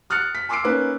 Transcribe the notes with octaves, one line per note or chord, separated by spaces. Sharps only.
D#6 F6 F#6 A6 C#7
B6
G#5 C6 D6 E6 C7 D7
A#3 C#4 D#4 B4